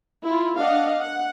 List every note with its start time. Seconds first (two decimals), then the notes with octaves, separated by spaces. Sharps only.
0.25 E4 F4
0.58 D4 D#5 F5 F#5
0.99 F#5